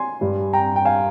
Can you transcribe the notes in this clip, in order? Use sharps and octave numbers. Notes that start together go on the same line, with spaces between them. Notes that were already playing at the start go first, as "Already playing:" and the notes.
Already playing: G#5 C6
G2 G3
G5 A#5
G5
F5 G#5